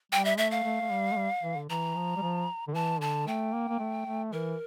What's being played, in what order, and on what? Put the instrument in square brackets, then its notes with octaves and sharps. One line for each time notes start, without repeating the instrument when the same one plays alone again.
[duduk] G3 [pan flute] G5
[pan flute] E5
[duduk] A3 [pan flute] E5
[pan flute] F5
[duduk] A3
A3
G3
A3
G3
E3
D3
[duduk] E3 [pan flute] A#5
[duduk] F3
G3
F3
D3
[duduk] E3 [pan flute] A5
[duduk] D3 [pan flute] A5
[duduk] A3 [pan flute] G5
[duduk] A#3
A#3
A3
A3
[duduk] E3 [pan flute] A#4